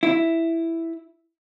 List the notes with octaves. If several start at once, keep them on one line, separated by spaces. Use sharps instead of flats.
E4